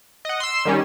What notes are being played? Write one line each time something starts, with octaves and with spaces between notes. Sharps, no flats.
D#5 F#5
C6 E6
D#3 G3 C#4